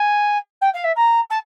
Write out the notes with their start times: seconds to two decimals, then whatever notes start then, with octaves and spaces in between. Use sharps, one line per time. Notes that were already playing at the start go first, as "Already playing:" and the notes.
Already playing: G#5
0.61 G5
0.73 F5
0.84 E5
0.95 A#5
1.30 A5